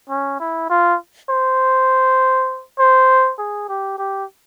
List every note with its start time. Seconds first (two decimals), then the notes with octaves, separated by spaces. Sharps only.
0.10 C#4
0.40 E4
0.69 F4
1.29 C5
2.79 C5
3.39 G#4
3.69 G4
3.98 G4